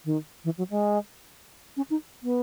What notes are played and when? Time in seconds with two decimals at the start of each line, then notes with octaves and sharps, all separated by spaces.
0.05 D#3
0.44 E3
0.58 F#3
0.70 G#3
1.77 C#4
1.90 D#4
2.23 B3